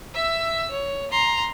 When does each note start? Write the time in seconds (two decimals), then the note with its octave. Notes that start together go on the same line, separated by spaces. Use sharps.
0.14 E5 E6
0.71 C#5
1.11 A#5 C6